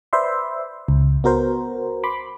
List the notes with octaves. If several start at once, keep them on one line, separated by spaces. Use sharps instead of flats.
B4 C5 D5 E5 C6
C#2
B3 F#4 A#4 C5
B5 C6 D6